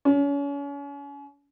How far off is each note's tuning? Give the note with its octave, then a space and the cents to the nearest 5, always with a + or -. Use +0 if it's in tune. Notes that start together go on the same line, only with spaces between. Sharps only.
C#4 +35